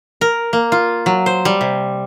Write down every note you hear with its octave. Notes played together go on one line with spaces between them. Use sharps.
A#4
A#3
F4
F#3
C5
G3
C3